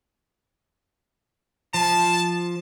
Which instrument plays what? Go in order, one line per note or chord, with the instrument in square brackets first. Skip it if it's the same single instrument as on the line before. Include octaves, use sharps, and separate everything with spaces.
[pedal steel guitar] F3 [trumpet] A5